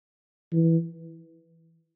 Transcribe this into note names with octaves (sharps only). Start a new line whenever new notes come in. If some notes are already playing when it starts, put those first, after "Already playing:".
E3